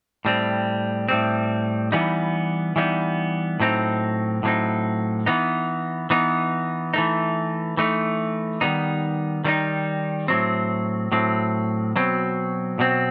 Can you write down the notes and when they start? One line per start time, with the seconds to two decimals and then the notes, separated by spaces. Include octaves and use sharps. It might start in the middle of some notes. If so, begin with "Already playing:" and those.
0.25 A2 G3 C4
1.08 A2 G3 C4
1.92 E3 G3 B3 D#4
2.76 E3 G3 B3 D#4
3.60 A2 F#3 C4 D#4
4.43 A2 F#3 C4 D#4
5.26 E3 B3 D#4
6.10 E3 B3 D#4
6.94 E3 A3 D#4
7.77 E3 A3 D#4
8.61 D#3 G3 B3 D#4
9.44 D#3 G3 B3 D#4
10.28 A2 F#3 C4
11.12 A2 F#3 C4
11.96 B2 F#3 C4
12.79 B2 F#3 C4